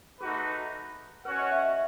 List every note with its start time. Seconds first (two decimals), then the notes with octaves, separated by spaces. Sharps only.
0.20 A3 D#4 F#4 G#4 B4
1.25 C#4 F#4 B4 C#5 F#5
1.39 D#5
1.51 E5
1.65 E5